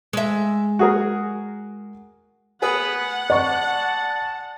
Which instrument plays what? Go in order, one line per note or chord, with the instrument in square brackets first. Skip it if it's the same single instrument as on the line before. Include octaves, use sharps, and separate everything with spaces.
[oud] G#3 E5
[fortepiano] F#4 G#4 A#4
[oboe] B3 [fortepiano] G#4 B4 D#6 [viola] F#5
[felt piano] D5 C#6 [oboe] A5